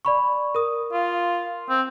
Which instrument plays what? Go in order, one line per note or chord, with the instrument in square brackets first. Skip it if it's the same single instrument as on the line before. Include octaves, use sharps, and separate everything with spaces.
[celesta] D5 B5 C#6
A#4 D#6
[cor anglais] F4
C4